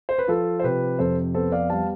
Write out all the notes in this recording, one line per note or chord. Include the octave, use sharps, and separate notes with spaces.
C5
B4
F3 F4 A4
C5
C3 G4 B4
F2 A4 C5
B3 A4 C5
D5 F5
G3 F5 A5